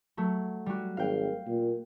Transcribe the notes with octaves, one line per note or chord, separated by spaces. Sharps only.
F#3 A3
G3 F#4
G#1 F5 G5
A#2